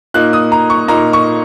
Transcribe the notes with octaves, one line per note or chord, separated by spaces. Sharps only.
A#2 A#3 D#4 F#6
D#6
A#5
C#6
A#2 A#3 D#4 A#5
C#6